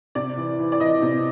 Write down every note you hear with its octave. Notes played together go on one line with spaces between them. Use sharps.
C3 D5
E3
E3
D5
E3 D#5
C3